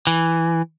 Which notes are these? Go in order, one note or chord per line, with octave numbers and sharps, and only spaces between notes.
E3